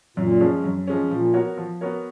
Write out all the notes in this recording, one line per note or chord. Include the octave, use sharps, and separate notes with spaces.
F#2 A#2
F3 G#3 C#4
F#2
F3 G#3 C#4
A#2 F3
B3 F#4 A#4 C#5
F3
B3 F#4 A#4 C#5